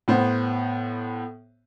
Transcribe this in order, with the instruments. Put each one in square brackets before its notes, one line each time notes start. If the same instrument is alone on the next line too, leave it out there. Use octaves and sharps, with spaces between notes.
[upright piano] A2 B3 C5